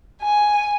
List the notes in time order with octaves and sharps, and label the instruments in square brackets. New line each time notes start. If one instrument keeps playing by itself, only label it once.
[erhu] G#5